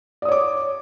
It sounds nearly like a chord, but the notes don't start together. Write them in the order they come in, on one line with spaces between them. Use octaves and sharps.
D5 D#6 C#5 D6